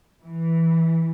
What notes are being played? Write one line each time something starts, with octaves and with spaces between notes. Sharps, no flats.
E3